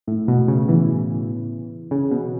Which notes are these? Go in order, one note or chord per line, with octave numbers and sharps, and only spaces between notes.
A2
B2
C#3
E3
C#3
B2